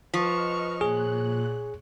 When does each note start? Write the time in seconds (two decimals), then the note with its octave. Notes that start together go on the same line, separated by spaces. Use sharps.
0.14 F3 B4 D#5 C#6 F6
0.81 A#2 G#4 C#5 F#6